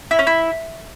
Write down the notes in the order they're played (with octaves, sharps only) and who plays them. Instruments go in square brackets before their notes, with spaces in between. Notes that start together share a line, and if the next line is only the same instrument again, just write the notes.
[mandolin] E4
C#4
E4